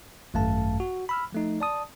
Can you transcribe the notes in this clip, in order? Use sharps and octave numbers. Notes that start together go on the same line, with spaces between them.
G#1 F#2 A3 F5 A5
F#4
B5 E6 F6
F3 A3 D#4
D5 A5 D#6